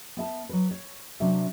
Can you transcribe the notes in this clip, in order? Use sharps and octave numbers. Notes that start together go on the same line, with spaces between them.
B3 E5 A5
F#3 B4
C#5
C3 F#3 D4 C5 E5